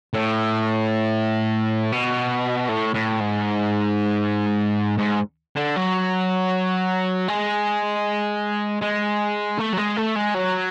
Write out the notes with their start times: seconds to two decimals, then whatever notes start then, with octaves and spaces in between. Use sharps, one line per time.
0.14 A2
1.92 B2
2.69 A2
2.94 A2
3.20 G#2
4.98 G#2
5.56 D3
5.76 F#3
7.28 G#3
8.82 G#3
9.58 A3
9.72 F#3
9.77 G#3
9.97 A3
10.15 G#3
10.34 F#3